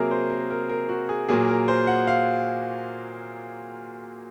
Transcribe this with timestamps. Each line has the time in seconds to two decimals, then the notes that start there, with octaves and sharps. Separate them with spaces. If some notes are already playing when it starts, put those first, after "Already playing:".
Already playing: C3 F#3 A#3 G#4 A#4
0.11 C5
0.30 A#4
0.50 A#4
0.69 A#4
0.89 F#4
1.09 G#4
1.29 A#2 F#3 A#3 G#4
1.48 A#4
1.68 C5
1.87 F#5
2.07 F5